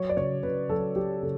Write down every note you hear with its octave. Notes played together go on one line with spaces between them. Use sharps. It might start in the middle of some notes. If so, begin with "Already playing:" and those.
Already playing: F#3 C#5
D5
C#3 C#5
C#3 B4
F#3 A4
F#3 G4
C#3 A4